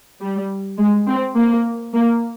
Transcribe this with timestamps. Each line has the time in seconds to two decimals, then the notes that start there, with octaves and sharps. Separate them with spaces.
0.21 G3
0.79 G#3
1.08 C4
1.36 A#3
1.94 A#3